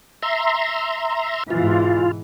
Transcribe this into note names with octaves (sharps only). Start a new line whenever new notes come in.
E5 A#5 C6
G#2 B2 E3 F4